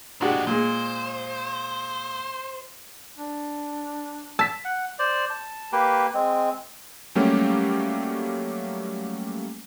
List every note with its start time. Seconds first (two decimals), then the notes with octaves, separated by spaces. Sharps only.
0.21 A#2 G#3 D4 F#4 G4
0.47 A#2 G#3 C5
3.18 D4
4.39 A5 E6 B6
4.65 F#5
4.99 C5 D5
5.30 A5
5.72 A#3 G4 B4
6.14 G#3 C4
7.15 F#3 G3 A3 A#3 C#4 G4